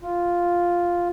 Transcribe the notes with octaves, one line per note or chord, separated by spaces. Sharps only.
F4